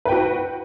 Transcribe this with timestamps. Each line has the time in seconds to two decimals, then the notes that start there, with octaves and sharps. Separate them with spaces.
0.05 B4
0.09 G5
0.12 F#4